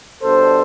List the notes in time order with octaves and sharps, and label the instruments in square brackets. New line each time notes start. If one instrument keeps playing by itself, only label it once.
[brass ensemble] B2 G3 D4 A4 C5